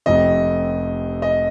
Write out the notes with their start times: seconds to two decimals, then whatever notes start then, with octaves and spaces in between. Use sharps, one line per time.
0.06 F1 F2 C3 D#5
1.22 D#5